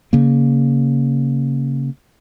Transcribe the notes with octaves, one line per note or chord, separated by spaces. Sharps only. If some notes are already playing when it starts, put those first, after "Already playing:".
C#3 A#3